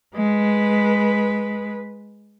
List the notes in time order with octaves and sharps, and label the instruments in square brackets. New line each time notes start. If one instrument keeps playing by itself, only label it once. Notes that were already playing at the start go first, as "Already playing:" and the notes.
[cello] G#3 B4